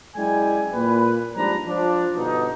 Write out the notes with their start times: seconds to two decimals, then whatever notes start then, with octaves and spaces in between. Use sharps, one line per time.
0.16 F#2 G#3 E4 D5 G5 G#5
0.74 A#2 B4
1.36 G#2 F3 G3 D4 B4 A#5
1.66 F3 D4
2.17 G1 B2 D#4